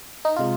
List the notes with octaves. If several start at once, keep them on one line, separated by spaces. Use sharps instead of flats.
D#4
C3 G#3 F4